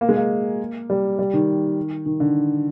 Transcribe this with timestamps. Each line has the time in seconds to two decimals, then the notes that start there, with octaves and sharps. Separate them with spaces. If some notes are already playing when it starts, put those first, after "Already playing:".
0.01 A#3
0.09 G#3
0.16 A#3
0.90 G3
1.19 G3
1.34 D#3
2.06 D#3
2.20 D3